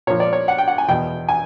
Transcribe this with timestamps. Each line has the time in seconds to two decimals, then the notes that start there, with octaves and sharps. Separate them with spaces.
0.07 A#2 F3 C#5
0.20 D5
0.33 C#5
0.48 F#5
0.58 G5
0.68 F#5
0.78 G#5
0.88 E2 B2 G5
1.28 G#5